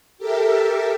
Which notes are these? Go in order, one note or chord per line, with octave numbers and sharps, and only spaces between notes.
G4 A4 A#4 E5